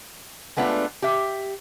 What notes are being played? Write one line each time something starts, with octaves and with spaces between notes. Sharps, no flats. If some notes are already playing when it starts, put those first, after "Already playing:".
G#3 A3 B3 D4 F4
G4 E5